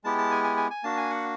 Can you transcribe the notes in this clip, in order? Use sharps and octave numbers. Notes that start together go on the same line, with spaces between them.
G#3 B3 E4 G4 A5
A5
G#5
G#5
G#5
G#5
A#3 D4 F#4 A5
G#5
F#5